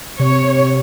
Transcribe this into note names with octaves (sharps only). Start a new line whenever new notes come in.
C3 C#5